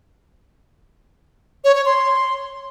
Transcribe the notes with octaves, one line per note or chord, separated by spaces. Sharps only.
C#5
C#5
C6